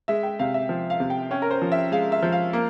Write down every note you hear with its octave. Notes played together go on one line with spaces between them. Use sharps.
G#3 E5
G5
C3 F5
E5
F3
F5
C3
G5
C#4 G5
A#4
C5
F3
E5
G#3 F5
E5
F3
F5
A#3